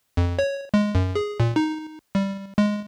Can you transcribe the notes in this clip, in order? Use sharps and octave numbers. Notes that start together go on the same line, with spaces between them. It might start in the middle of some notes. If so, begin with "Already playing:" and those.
F2
C#5
G#3
F#2
G#4
A#2
D#4
G3
G#3